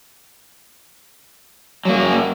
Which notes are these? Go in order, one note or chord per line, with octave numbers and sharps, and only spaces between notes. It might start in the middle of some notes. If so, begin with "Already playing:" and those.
F#2 F#3 A#3